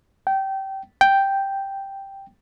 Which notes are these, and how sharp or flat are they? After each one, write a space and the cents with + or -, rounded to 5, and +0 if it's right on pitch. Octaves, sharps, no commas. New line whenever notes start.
G5 -20
G5 +0